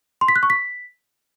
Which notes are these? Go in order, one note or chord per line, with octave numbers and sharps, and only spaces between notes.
C6
B6
F#6
C#6
B6